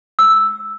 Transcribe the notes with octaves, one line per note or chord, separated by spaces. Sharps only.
E6